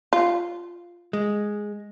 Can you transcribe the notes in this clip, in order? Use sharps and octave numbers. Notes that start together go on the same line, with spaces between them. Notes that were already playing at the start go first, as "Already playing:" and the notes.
F4
G#3